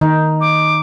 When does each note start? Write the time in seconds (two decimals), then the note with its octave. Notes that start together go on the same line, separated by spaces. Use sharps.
0.01 D#3 D#4
0.41 D6